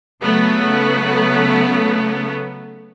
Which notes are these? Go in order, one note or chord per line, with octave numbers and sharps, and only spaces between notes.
C#3 F#3 A3 B3